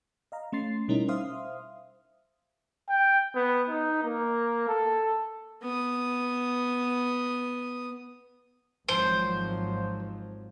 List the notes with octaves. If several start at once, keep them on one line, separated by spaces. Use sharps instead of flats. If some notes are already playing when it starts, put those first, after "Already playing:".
D#5 F5 A#5
A3 C#4 C6 A6 C7
B2 G3 C#4 D#4 E4 A#4
C5 E5 F5 C6 D#6 F6
G5
B3
D#4
A#3
A4
B3 D#6
G#1 F3 F#3 C5